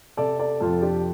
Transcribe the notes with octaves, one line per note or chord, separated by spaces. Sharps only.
C3 A4 D5
A4 D5
F2 F4 A4
D4 G4